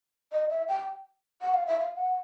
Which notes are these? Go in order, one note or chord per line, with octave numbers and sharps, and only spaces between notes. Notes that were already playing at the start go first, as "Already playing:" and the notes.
D#5
E5
G5
F#5
F5
E5
F5
F#5